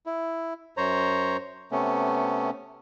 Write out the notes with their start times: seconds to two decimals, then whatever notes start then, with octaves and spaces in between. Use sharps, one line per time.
0.06 E4
0.77 F#2 C5 C#5 A#5
1.72 C3 A3 B3 C#4